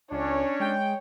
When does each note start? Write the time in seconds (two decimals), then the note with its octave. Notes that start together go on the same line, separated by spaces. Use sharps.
0.12 C#2 C#4 D4 C#5
0.60 G#3 G5